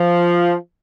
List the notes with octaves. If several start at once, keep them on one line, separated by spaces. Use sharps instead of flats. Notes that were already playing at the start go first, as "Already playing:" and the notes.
Already playing: F3